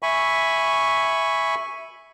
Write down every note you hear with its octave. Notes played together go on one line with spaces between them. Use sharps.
E5 G#5 B5 C#6